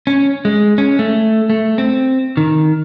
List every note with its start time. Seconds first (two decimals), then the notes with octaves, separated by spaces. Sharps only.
0.07 C#4
0.45 G#3
0.78 C#4
0.99 A3
1.50 A3
1.78 C4
2.37 D#3